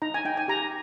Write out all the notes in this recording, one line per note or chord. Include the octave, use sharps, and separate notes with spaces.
D#4 A#5
G#5
D#4 G5
G#5
G4 A#5